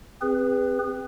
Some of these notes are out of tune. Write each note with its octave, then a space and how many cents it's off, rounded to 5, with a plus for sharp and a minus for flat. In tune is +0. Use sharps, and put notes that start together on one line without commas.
C4 +0 G#4 -35 B4 +5